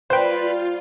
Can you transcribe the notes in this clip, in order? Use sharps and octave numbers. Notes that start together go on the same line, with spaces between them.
G3 A#3 F4 B4 C5 G5